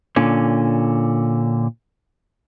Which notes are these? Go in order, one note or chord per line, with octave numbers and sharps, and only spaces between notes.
A#2 D3 C#4